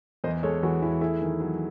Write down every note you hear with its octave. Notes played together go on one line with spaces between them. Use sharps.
E2 C5 D#5
G#3 A4 C#5
E3 F#4
E2 E4
A3 E4 G#4
D#3
F#3